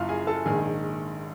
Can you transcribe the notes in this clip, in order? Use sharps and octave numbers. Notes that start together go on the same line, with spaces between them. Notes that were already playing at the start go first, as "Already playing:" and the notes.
Already playing: F#1 F#2 C#3 E4 F4 F5
G#4 G#5
A4 A5
A#1 G#2 D#3 G#4 G#5